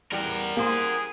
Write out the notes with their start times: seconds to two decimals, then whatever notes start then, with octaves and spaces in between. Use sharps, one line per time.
0.12 E2 G3 G4 A#4 F#5
0.57 A#3 G4 G#4 C5